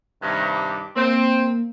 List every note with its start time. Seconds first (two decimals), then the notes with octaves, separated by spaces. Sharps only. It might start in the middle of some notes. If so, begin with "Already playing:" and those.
0.22 G2 C3 D#3
0.55 D6
0.96 A#3 C4